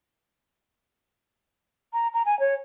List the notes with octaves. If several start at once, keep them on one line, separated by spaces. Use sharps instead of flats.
A#5
A#5
G#5
C#5